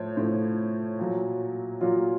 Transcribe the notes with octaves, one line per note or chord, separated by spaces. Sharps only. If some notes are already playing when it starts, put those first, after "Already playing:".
Already playing: A2 F3 C5 C#5
A2 F3
A#2 F#3
A#2 F#3 F4